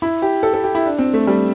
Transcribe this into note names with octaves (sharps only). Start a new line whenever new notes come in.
E4
G4
A4
A4
G4
E4
D4
C4
A3
G3